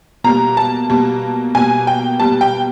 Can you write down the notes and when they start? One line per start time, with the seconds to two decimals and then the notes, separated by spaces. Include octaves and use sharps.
0.24 B2 G3 A#3 A#5
0.57 A5
0.90 B2 G3 A#3
1.55 B2 G3 A#3 G#5
1.87 G5
2.20 B2 G3 A#3 A5
2.41 G5